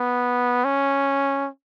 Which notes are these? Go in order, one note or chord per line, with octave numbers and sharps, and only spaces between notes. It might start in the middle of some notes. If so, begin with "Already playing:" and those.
Already playing: B3
C#4